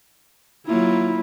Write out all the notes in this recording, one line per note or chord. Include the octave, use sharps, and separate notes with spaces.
F#3 A#3 E4 F4